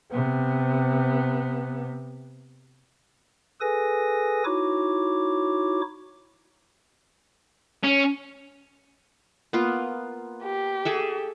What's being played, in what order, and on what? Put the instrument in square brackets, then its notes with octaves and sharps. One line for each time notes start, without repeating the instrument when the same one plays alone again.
[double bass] C3 B3
[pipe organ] G#4 A4 B4 G#5 D#6 A#6
D#4 E4 F#4 C#5 D6
[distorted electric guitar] C#4
[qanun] A#3 B3 F4
[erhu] G4
[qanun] G#4 A4 E5